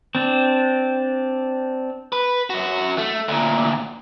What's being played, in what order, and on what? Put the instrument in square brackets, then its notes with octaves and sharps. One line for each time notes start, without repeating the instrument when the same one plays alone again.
[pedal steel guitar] C4 D4
[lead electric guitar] B4
F#2 F#4
A3
D2 A#2